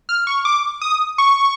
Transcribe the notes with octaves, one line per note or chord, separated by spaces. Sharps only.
F6
C#6
D6
D#6
C#6